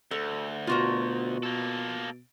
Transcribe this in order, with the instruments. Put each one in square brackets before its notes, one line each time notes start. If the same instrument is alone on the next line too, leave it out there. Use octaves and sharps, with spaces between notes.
[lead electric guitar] D2 [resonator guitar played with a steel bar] A4
[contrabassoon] B2 [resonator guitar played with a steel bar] F4 F#4 A#4
[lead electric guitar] A#3 A4